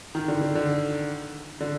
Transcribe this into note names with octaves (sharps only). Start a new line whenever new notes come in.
D#3
D3
D3
D3
D3